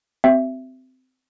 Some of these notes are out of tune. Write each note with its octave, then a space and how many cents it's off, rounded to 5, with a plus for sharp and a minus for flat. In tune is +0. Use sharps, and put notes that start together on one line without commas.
C4 -20 G4 -40 E5 +15